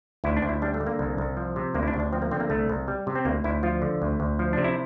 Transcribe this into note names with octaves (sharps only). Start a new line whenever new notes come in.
D2 E4
D4
D2
E4
G3 D4
A3
D3
A#3
C2
C2
F3
C3
D2 A#3
E4
D4
D2
D4
F3 C4
A#3
D3 C4
A#3
C2 A3
C2
G3
C3
C4
D2 A#3
D2 E4
F3 F4
D3
D2
D2
F3
C3 D4
E4